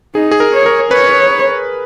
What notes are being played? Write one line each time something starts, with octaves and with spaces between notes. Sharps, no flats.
D#4 G#4
G#4
A#4
C#5
A#4
B4 C#5